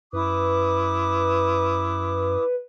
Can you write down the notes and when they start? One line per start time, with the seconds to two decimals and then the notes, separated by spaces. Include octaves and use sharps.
0.13 F#2 E4 B4 D6 D#6